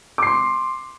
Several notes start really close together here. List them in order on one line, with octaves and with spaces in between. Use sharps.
D6 C7 C6